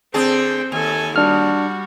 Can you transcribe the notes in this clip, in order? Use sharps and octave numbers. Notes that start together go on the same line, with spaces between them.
D3 C4 D4 G#4 G5
D#2 A4 G#5
G3 D4 F#4 F6